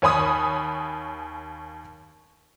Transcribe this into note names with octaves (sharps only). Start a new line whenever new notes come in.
D#2 C#5 G#5 B5 D#6